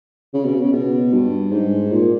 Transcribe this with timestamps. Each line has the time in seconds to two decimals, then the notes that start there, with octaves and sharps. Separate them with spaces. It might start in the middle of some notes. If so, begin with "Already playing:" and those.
0.34 C#3
0.45 B2
0.55 C#3
0.73 B2
1.12 G2
1.51 G#2
1.92 A#2